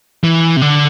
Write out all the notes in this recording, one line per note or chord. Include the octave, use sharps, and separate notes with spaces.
E3
C3
D3